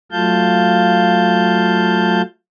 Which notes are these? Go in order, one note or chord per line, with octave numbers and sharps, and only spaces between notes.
F#3 A3 F4 F5 A5 G6